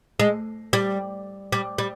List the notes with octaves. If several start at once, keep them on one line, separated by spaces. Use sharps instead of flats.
G#3
G3
G3
G3